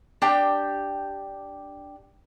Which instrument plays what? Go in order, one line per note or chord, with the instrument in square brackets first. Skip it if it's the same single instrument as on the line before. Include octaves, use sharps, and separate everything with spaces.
[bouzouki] D4 G4 G5